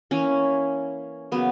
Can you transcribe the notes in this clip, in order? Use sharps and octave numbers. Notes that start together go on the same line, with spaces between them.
E3 A#3 C#4
C#3 F#3 A#3 B3